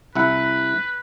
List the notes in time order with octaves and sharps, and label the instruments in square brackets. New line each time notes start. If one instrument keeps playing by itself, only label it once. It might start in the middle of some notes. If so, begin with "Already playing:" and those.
[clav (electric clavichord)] C2 E4 F#5 [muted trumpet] B4